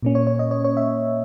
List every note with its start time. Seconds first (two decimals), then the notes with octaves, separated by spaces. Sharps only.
0.03 A#2 A#3 C#4
0.15 C#5
0.27 C#5
0.39 D#5
0.51 C#5
0.64 C#5
0.77 E5